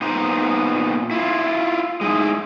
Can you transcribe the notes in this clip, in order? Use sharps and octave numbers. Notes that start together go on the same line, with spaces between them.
A#2 B3 D#4 C5 A#5
E4 F4
G#3 D#4 E4